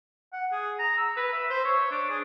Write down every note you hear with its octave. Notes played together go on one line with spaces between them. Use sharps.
F#5
G#4
A#5
E6
B4
E5
C5
C#5
D4
G#4